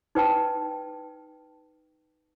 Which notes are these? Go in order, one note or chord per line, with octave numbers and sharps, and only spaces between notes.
D#4 B4 G5 A5